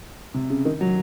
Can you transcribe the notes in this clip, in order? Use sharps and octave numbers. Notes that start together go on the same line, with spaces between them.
C3
C#3
D#3
F#3